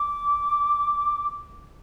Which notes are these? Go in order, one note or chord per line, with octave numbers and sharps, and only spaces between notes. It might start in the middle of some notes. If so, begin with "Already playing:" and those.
Already playing: D6